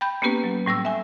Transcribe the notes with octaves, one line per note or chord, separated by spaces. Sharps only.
G5 B5 G6
A#3 B3 C#4 G4 B4
F#3
A2 G3 C#6 E6
E5 G#5